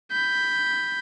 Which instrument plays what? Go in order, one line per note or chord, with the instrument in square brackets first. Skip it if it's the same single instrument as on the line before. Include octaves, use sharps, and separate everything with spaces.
[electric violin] B5 G6